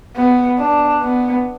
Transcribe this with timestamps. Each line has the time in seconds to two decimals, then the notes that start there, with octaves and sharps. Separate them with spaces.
0.16 B3
0.59 D4
1.02 B3